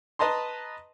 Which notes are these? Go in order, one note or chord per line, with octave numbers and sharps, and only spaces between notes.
B4 D#5 A5 A#5 C6